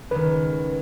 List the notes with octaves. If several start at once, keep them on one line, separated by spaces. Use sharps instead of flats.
C#2 D#3 B4